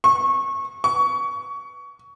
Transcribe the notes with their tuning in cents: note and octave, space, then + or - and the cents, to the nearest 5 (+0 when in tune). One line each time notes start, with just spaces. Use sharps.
C#6 -20
C#6 +25